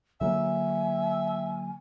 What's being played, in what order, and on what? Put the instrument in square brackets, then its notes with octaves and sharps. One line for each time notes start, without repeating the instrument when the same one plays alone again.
[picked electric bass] D3 F#3 A#3 [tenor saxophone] E5 [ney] G#5